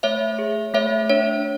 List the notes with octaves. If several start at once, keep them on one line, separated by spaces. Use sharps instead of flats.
A3 C#5 E5
G#4
A3 C#5 E5
D4 C#5